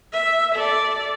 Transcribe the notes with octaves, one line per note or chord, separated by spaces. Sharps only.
E5
A4 D5